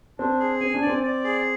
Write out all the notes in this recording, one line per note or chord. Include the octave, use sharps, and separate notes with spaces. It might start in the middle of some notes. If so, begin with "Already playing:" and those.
C4 D4
G#4
C4 G#5
D4
D5
C4
D5
G#4